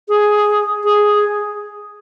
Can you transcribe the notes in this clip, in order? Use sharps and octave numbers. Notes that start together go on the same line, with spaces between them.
G#4
G#4